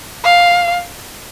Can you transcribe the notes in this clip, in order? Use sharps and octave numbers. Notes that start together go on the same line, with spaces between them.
F5